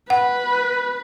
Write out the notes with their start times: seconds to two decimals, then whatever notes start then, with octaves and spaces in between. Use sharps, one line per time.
0.10 B4 F#5